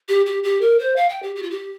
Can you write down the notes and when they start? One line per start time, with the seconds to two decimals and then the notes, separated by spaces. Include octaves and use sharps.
0.08 G4
0.26 G4
0.43 G4
0.61 A#4
0.79 C5
0.96 F5
1.09 G5
1.23 G4
1.36 G4
1.43 F4
1.50 G4